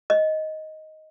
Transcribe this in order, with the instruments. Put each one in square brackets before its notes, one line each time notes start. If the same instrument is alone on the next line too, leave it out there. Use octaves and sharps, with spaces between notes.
[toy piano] D#5